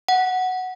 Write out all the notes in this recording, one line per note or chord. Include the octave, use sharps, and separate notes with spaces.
F#5